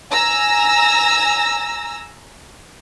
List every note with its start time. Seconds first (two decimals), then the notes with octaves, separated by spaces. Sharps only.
0.12 G#5 A#5 E6 A#6